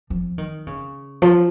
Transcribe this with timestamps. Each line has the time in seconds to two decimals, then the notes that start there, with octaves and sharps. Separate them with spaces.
0.10 F3
0.38 D#3
0.67 C#3
1.22 F3